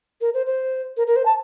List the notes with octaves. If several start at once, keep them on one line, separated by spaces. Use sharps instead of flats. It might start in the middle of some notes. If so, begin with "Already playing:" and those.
A#4
C5
C5
A#4
A#4
C5
A5